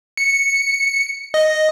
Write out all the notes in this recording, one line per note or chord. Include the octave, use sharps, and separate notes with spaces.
C#7
D#5